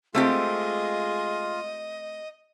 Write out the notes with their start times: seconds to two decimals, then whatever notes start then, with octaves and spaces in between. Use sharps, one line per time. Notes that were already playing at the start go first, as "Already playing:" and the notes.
0.15 G#3 A3 C4 F4 G4 D#5